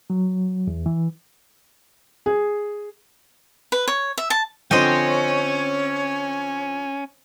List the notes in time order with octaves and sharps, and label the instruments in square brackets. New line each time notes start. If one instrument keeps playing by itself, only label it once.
[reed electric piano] F#3
E2
E3
[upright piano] G#4
[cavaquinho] B4
C#5
E5
A5
[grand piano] D3 F3 C4 [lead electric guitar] C#4 [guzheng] C5 D#5 G5 [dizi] C#5